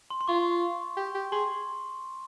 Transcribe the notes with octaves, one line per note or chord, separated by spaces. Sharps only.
C6
C6
F4 C#6
G4
G4
G#4 C6